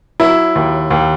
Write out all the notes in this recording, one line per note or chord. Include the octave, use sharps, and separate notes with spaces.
F#3 E4
D#2
D#2